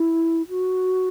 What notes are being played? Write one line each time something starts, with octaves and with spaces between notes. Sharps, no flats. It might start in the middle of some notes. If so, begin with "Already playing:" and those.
Already playing: E4
F#4